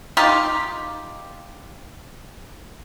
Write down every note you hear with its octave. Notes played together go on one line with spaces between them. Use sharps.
D#4 F4 G4